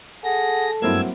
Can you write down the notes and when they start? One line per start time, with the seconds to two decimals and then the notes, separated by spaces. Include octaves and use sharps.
0.24 G#4 A4 F#5 A#6
0.82 G2 F#3 A#3 C4 E4 E6 G#6